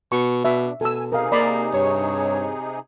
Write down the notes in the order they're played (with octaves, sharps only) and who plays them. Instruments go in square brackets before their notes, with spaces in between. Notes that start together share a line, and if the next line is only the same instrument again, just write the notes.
[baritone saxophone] B2 [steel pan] C#6
[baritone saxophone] B2 [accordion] D4 [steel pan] E5
[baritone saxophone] B2 [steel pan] A4 E6 [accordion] G#5
[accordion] C3 D#4 G#4 [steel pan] A#4 F5
[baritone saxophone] A#3 [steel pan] D5 B5
[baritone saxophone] G2 [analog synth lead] C#5